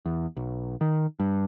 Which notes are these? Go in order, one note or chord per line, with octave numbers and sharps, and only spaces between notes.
E2
B1
D#3
G2